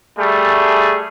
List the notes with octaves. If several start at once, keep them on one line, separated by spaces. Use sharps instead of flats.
G3 A3 G#4